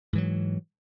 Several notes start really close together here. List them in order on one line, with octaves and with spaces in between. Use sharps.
G#2 E3 F#3